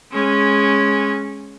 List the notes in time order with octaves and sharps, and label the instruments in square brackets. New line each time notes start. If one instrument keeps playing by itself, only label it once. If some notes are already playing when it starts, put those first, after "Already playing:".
[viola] G#3 C#4